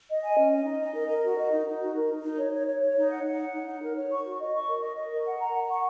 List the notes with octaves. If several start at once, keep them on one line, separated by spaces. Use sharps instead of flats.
D#5
G#5
C#4
D#5
D#4
D#5
A#4
A#4
F#4
D#5
D#4
D#4
F#4
A#4
D#4
D#4
C#5
C#5
C#5
C#5
D#4
F#5
F#5
F#5
D#4
D#4
A#4
C#5
C#6
F#4
D#5
C#6
A#4
D#5
D#5
A#4
F#5
A#5
F#5
C#6